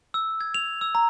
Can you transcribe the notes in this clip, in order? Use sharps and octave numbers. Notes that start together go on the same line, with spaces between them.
E6
G#6
F7
E6
A#5